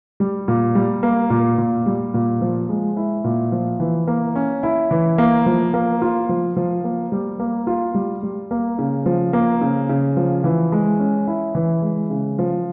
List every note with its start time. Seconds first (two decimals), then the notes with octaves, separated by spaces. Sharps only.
0.20 G3
0.48 A#2
0.75 G3
1.03 A#3
1.30 A#2
1.58 A#2
1.86 G3
2.14 A#2
2.41 F3
2.69 G#3
2.97 E4
3.24 A#2
3.52 F3
3.80 E3
4.07 A#3
4.35 C#4
4.63 E4
4.91 E3
5.18 A#3
5.46 F3
5.74 A#3
6.02 F4
6.29 F3
6.57 F3
6.84 A#3
7.12 G3
7.40 A#3
7.67 F4
7.95 G3
8.23 G3
8.51 A#3
8.79 C#3
9.06 F3
9.33 A#3
9.61 C#3
9.90 C#3
10.17 F3
10.44 E3
10.72 G#3
10.99 C#4
11.27 E4
11.55 E3
11.82 G#3
12.10 C#3
12.39 F3